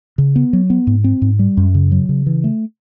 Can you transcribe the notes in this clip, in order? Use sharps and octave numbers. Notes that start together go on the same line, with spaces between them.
C#3
B3
F#3
B3
G#2
C4
G#2
G3
F#2
C#3
F#3
C#3
E3
A3